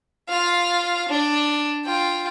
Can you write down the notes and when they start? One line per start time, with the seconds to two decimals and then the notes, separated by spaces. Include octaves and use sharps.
0.29 F4 F5
1.09 D4
1.85 F4 G5